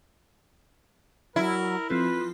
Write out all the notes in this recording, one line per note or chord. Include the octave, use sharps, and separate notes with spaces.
F#3 E4 A#4
F3 C4 F4 A4 B4